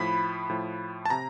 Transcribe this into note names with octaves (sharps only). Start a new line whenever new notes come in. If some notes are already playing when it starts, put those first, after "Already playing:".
Already playing: A2 F3 B5
A2 F3
A5
C3 A#5